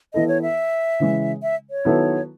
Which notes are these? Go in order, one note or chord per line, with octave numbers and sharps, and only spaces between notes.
E3 B3 E4 A4 D#5
C#5
E5
C#3 E3 G#3
E5
C#5
D#3 F#3 B3 E4 A4